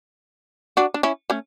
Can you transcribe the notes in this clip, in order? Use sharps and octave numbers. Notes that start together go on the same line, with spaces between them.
D4 F#4
D4
C#4 E4
A3 C#4